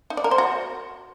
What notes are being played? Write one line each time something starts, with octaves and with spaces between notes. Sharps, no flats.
D#4
D5
A#4
C5
F#4